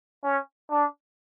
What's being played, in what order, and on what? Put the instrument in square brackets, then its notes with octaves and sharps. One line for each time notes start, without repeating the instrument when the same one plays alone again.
[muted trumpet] C#4
D4